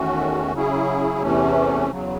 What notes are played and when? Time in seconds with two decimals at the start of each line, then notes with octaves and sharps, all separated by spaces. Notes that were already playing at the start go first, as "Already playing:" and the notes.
Already playing: E2 D#3 A3 C#4 F#4
0.53 C#3 F#3 C#4 E4 G#4
1.22 E2 C3 E3 A3 C#4
1.91 E2 C#3 F#3